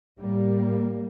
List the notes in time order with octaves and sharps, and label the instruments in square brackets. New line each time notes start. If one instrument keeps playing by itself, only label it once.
[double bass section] A2 G3 A#3